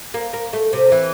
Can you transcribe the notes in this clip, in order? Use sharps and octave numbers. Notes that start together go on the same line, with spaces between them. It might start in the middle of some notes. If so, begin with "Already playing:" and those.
A#3
A#3
A3
C3
E3